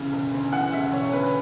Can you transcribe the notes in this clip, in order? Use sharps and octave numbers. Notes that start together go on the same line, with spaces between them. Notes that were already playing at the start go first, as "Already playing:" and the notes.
Already playing: E1 D2 C#3 E3
E1
D2
E3 F#5
C#3 E5
E1 C#5
D2 B4